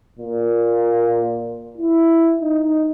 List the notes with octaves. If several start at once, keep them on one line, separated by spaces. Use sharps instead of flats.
A#2
E4
D#4